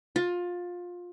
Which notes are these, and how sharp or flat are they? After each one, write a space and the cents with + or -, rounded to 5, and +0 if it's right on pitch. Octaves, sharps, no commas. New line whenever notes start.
F4 +20